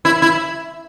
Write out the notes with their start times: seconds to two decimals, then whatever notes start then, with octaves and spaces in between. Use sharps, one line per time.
0.05 E4
0.22 E4